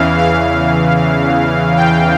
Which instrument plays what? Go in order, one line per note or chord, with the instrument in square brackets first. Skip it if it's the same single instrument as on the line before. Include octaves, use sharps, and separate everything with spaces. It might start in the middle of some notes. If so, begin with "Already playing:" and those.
Already playing: [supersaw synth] E2 C#3 E3 F5
F5
G5